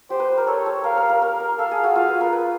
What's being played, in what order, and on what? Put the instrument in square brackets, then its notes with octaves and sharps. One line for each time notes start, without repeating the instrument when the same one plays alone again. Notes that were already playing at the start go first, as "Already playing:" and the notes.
[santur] G4 [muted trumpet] C5
[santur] B4
A#4
[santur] A4 [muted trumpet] C#5
[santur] A4
[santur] A#4 [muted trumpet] F5
[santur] A#4
A#4
A#4
A#4
[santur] A4 [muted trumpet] F5
[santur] G#4
F#4
[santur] F4 [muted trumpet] F5
[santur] B4
A#4
B4